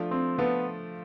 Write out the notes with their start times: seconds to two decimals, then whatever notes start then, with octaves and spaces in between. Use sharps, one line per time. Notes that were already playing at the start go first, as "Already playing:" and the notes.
Already playing: F3 A3 D4 F4 A4
0.11 C4
0.38 F3 A3 B3 D4 F4 A4